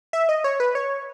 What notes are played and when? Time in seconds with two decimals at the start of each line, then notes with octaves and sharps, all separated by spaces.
0.13 E5
0.29 D#5
0.44 C#5
0.60 B4
0.75 C#5